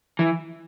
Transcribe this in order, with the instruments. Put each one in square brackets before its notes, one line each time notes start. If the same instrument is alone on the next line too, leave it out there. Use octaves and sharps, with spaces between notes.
[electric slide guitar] E3